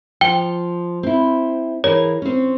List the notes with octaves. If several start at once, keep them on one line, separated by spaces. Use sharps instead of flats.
F3 G5 G7
C4 E4
E3 G#4 A#4 C#5
C4 C#4